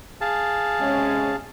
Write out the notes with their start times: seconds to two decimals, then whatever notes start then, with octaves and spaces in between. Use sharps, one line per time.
0.21 G#4 F5 A5
0.79 C3 G#3 C#4